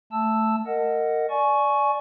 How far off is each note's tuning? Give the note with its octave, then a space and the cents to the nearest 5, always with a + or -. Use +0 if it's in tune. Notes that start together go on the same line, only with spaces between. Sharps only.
A3 +0 A5 +0 E6 +0
A#4 -20 D#5 +0 F#5 +0
D5 +0 G#5 +30 C#6 +0